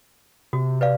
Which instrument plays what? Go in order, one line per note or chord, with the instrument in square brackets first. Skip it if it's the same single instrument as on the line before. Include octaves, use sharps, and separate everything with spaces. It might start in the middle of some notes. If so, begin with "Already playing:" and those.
[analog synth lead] C3 [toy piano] F#4
[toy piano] B4 D5 F5